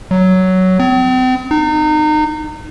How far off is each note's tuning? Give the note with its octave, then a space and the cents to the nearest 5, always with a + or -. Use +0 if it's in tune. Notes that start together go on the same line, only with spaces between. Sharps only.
F#3 +10
C4 -40
D#4 -30